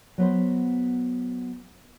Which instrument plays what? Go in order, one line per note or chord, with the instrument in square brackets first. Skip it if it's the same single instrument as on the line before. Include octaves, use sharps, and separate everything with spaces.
[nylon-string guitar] F#3 B3 C5